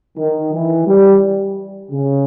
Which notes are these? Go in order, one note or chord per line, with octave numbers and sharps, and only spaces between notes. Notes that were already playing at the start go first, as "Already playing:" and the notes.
D#3
E3
G3
C#3